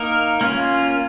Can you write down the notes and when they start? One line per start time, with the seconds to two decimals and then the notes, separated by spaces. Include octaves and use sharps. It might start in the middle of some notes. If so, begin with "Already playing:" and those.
Already playing: A#3 D#4 A#4
0.41 A#3 C#4 F4